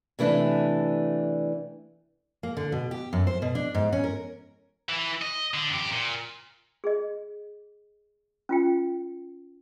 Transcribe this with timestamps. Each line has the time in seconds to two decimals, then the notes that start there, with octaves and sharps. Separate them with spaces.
0.19 C3 E3 A3 D4
2.43 A#3
2.57 D3
2.72 B2
2.91 G4
3.13 F#2
3.27 C5
3.42 B2
3.55 D4
3.75 G#2
3.93 C#4
4.04 A#4
4.89 E3
5.22 D#5
5.54 D3
5.70 F#2 G4
5.90 A#2
6.84 G#4 D#5
8.49 C#4 F4 G5